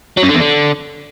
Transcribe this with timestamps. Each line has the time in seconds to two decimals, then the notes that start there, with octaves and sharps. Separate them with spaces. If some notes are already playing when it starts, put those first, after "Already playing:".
0.17 F#3
0.23 F#2
0.29 D3
0.34 E2
0.40 D3